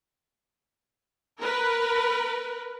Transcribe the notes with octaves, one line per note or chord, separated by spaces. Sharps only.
A#4 B4